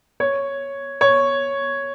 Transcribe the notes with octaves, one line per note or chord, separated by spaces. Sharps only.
C#5
C#5